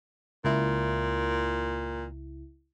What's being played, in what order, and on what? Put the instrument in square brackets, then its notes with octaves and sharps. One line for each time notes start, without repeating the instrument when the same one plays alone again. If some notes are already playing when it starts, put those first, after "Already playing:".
[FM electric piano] C#2 E4 [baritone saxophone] A#2